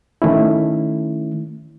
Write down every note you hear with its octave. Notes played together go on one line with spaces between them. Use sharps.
D#3 A3 C#4 E4